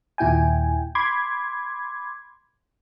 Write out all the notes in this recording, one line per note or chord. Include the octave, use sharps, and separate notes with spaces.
D#2 A#2 E4 G5 G#5
B5 C6 D6 G#6